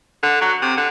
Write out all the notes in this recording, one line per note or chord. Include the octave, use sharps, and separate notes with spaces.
D3
F#3
C3
D3